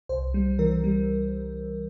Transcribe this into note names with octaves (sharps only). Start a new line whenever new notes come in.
C2 C5
G3
E3 A#4
G3